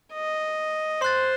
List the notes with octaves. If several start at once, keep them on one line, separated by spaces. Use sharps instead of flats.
D#5
C5 C6 F#6 A6